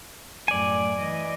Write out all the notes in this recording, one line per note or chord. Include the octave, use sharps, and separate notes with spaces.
F#2 A2 D5 G#5
E3 D#5